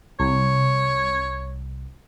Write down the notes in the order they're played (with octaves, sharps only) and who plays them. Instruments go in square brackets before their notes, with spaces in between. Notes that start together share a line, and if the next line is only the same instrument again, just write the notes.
[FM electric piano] C2 [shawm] C#5